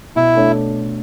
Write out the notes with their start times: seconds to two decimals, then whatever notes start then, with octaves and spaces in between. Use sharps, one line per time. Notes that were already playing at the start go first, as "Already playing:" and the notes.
0.16 B2 E4
0.35 A3 D4 A4 C#5